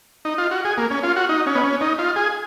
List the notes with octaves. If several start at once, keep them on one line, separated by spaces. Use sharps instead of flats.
D#4
F4
F#4
G#4
A#3
C#4
F4
F#4
D#4
C#4
B3
C#4
D#4
F4
G#4